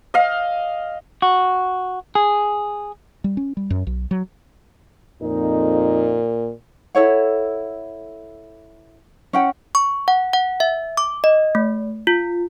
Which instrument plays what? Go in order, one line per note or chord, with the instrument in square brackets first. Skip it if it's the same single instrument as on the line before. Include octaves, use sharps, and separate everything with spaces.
[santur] D#5 F5
[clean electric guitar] F#4
G#4
[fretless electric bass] G3
C#4
G3
F#2
B1
F#3
[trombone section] F2 D#4 [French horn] A#2
[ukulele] E4 A4 C#5 F#5
C#4 F#5 G5
[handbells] C#6
F#5
F#5
E5
D6
D#5
A3
F4